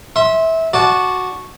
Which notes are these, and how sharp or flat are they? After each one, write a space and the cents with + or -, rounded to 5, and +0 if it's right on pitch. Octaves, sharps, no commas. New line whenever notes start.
E5 -20 C6 +15
F#4 -5 D5 +0 A5 -20